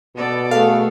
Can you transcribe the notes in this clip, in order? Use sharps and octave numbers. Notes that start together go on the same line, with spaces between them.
B2 B3 A4 D5
A3 B3 F#4 G#4 A4 F5